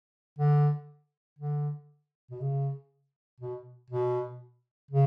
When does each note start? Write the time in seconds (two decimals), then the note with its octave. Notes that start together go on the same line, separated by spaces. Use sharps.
0.39 D3
1.39 D3
2.31 B2
2.40 C#3
3.40 B2
3.90 B2
4.91 C#3